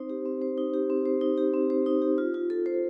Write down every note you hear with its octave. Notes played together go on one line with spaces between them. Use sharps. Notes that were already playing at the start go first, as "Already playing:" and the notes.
Already playing: C4 D#4 C5
G4
C4
C5
D#4
G4
C4
C5
D#4
G4
C4
C5
D#4
G4
F4
F4
A4
C5